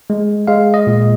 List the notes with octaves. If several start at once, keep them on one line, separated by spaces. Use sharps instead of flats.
G#3
G#3 F5
D#5
A#2